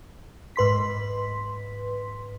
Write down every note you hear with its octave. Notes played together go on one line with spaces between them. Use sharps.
G#2 B4 C6 B6